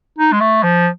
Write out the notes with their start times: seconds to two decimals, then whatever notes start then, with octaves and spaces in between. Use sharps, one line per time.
0.19 D#4
0.32 G#3
0.40 A3
0.63 F3